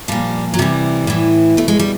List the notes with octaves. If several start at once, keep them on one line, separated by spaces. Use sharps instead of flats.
A#2 F3 G3
F#3
C3 E3 G3
A2 E3
B2 A3
G#3
G3